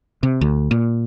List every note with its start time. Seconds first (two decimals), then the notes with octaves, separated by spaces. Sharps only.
0.23 C3
0.41 D2
0.71 A#2